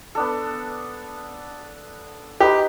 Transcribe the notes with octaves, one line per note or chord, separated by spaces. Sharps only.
B3 D4 A4
D#4 G4 B4 A#5